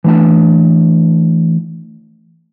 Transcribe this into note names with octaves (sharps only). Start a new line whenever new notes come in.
E3 F#3 A3 D4 A5